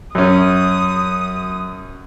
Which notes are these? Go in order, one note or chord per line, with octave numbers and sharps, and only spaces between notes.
F#2 F#3 C#4 D#6